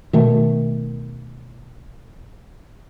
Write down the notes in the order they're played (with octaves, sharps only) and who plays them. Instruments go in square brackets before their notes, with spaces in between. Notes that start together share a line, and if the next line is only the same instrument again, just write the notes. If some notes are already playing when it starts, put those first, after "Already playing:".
[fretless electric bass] B2 D#3 A3